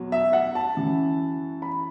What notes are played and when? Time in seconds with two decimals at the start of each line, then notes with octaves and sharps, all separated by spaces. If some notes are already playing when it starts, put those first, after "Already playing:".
Already playing: E2 B2 F#3
0.12 E5
0.33 F#5
0.55 A5
0.76 F#2 E3
1.62 B5